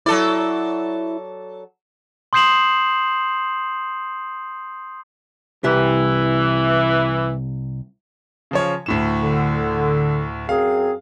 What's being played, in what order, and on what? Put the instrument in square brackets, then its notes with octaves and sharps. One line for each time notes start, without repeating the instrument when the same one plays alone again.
[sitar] F#3 A4 D5 [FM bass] E4
[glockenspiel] C6 D#6 G6 C7 E7 F#7
[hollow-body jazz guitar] C2 G4 E5 [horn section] E3
[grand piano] C#3 F3 C#5
D2 A2 E7
[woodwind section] D3
[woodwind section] F#2 C4 G#4 [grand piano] F5